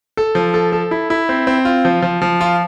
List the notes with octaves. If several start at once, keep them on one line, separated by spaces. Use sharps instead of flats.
A4
F3
A4
A4
E4
E4
C4
C4
F4
F3
F3
F3
F4